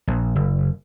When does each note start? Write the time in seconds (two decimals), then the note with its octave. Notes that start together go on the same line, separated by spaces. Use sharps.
0.07 A#1
0.35 F#1